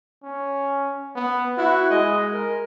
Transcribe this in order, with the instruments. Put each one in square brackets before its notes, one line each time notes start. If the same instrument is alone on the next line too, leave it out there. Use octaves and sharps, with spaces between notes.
[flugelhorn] C#4
B3
[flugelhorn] E4 [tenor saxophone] F#4
[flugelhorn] G#3 [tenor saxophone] D#5
[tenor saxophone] A#4